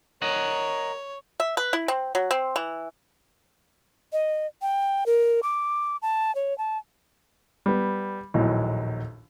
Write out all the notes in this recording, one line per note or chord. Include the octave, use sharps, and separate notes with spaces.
A#4 C#5 D#5 F#5
E5
B4
E4
C4
F#3
C4
E3
D#5
G5
A#4
D6
A5
C#5
A5
G3 B3
A#1 D#2 A2 F#3